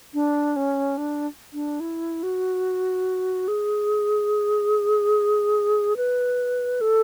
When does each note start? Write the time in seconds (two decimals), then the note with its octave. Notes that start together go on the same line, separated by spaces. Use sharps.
0.14 D4
0.56 C#4
0.98 D4
1.53 D4
1.80 E4
2.23 F#4
3.48 G#4
5.97 B4
6.81 A4